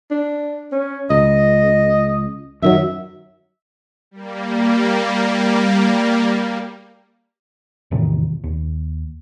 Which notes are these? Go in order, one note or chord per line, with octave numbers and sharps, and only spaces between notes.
D4
C#4
C#2 D#5
F#2 D#3 F#3 E5
G3 A#3
E2 A2 C3 D#3
D#2